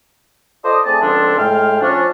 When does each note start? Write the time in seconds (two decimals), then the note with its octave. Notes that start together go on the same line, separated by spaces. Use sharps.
0.64 F4 A4 C5 D5 D#5
0.85 A3 C4 G#4 D5 A5
1.01 C#2 D3 F3 C4 D4 A4
1.37 A2 G#3 F5 G5 F6
1.81 F3 C#4 D4